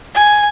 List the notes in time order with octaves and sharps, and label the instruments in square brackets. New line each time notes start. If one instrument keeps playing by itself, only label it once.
[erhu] G#5